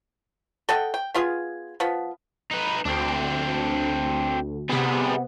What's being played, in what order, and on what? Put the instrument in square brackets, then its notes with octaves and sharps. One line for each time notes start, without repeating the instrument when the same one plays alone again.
[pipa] A4 D#5 F#5 G5
G5
B3 F4 G#4
F3 B3
[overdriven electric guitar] D#4 B4
[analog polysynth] D2 [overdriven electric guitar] C4 D4
[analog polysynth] C3 B3 [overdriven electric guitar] G3 G#4